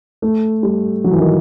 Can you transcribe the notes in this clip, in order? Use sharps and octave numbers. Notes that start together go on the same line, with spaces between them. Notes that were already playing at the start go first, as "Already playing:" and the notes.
A3
G3
F#3
E3
D#3